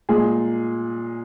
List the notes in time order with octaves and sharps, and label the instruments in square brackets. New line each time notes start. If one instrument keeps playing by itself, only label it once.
[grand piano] A#2 G#3 G#4